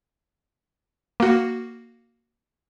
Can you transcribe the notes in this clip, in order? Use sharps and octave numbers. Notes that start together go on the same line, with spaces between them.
A#3 F#4